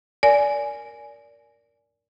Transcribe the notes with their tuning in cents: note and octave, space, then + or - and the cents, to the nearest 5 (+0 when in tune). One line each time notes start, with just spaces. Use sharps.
A#4 +0 D5 -20 G#5 +5